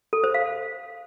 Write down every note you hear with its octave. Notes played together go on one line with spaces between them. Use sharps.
A4
C5
F5